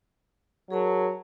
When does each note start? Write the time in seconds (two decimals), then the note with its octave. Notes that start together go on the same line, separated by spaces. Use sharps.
0.70 F#3 G#4 A#4 A5